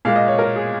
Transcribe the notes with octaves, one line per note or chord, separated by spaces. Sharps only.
A#2 G#3 F5
D#5
C#5
A#4
G#4